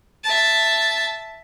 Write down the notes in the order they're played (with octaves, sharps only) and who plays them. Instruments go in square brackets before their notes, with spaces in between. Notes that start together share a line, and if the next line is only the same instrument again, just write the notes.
[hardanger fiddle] E5 A5